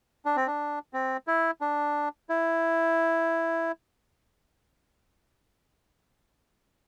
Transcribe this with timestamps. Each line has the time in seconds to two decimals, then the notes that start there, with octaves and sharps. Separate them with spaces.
0.25 D4
0.36 C4
0.47 D4
0.93 C4
1.27 E4
1.61 D4
2.29 E4